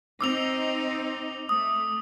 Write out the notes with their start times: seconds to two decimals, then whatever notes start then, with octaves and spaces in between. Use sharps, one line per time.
0.21 C4 D#4 D6 E6 F7
1.49 A3 D#6